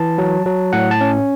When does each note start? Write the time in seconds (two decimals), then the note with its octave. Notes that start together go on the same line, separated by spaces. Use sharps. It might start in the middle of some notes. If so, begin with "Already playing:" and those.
Already playing: E3 A5
0.18 F#3
0.46 F#3
0.73 A2 F#5
0.91 A5
1.01 C#4